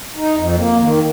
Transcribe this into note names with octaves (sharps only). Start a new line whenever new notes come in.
D#4
F2
A#3
D#3